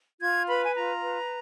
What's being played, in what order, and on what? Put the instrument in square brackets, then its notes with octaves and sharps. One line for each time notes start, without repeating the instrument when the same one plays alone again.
[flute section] F4 G#6
B4 B5
G#5
F4 A#5
B4